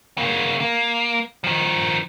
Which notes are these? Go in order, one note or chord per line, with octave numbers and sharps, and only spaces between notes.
C#3 A#3
A#3
D#3 F3